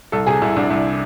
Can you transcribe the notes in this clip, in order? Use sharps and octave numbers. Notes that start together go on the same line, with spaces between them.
C2 A4
C3 G#4
C2 E4
C2 D4
C2